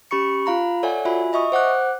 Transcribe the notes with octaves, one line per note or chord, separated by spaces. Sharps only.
C#4 G4 B5 C#6 C#7
F4 F5 A#5 B5
A4 C#5 D5 E5 F#5 G#5
F4 F#4 E5 G#5 B5
D#5 E5 C#6 D#6
C5 F#5 D6 F#6